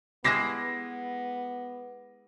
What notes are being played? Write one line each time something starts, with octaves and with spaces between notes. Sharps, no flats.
G#3 B3 E4 G4 D6 A#6 C7